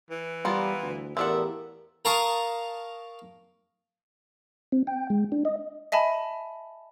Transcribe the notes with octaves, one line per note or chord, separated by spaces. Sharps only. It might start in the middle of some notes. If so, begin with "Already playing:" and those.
E3
G3 B3 F4 A#4
D2
E2 A2 F3 D4 G4 A#4 E5 F#5
A#4 F5 A5 A#5 C#6 D#6
C4
G5
G#3
D4
D#5
D#5 E5 G#5 A5 B5